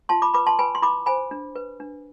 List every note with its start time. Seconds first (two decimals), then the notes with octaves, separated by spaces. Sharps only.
0.09 F4 A5 C6
0.22 B5 D6
0.34 B4 B5 D6
0.46 A5 C6
0.59 B4 G#5 B5
0.75 C6
0.82 E4 B5 D6
1.06 C5 G#5 B5
1.31 D4
1.56 B4
1.80 D4